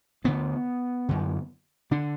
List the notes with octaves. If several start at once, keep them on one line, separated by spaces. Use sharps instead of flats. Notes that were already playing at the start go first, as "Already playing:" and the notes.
D2 D3 B3
F#2 D3
D3 D4